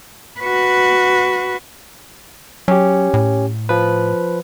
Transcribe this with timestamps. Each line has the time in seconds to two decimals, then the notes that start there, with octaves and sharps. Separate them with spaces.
0.40 F#4 B4
2.68 F#3 C#4 G4
3.14 A2
3.69 F3 B4